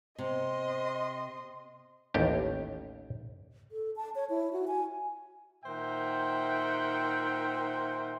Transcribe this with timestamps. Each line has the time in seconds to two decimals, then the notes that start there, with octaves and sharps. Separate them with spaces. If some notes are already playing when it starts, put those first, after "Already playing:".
0.18 C3 D#5 C6
2.14 A1 D#2 G4
3.72 A4
3.96 A5
4.15 C#5
4.30 E4
4.53 F#4
4.68 G#5
5.65 A#2 D#3 C5 E5 F#5 G5